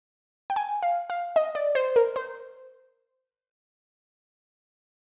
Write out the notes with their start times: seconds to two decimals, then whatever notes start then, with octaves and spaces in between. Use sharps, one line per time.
0.50 G5
0.56 G#5
0.83 F5
1.10 F5
1.36 D#5
1.55 D5
1.75 C5
1.96 A#4
2.16 C5